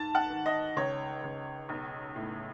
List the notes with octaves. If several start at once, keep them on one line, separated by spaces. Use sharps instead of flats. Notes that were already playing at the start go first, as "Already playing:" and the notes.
Already playing: G#2 A5
F#5
D#3
D#5
C#2 C#5
C#2
B1
A2